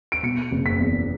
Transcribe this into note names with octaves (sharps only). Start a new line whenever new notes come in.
D7
B2 C#7
F#1
B6
E2